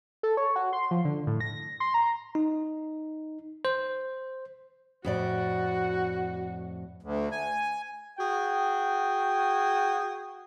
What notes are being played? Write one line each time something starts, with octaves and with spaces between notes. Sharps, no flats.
A4
C#5
F#4
C6
F3
D3
A2
A#6
C6
A#5
D#4
C5
F2 A2 F#4 D5
D2
G#5
F#4 G#4 G5